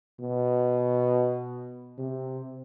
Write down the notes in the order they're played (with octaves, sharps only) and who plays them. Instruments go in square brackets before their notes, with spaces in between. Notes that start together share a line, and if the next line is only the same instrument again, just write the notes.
[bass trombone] B2
C3